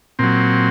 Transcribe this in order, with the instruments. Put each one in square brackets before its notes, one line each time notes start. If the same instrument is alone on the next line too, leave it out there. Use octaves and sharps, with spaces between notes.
[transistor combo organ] A#2 F#3 C4